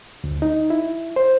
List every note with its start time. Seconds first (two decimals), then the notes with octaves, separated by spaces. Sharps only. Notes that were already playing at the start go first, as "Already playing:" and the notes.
0.24 D2
0.42 D#4
0.70 E4
1.16 C5